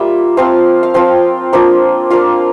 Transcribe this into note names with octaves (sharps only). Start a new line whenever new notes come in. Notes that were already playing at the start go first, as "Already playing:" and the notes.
Already playing: G3 A#3 F4 E5
F3 C4 F4 F5
F5
F3 C4 F4 G5
F3 A#3 D4 F4
A#3 D4 F4 F5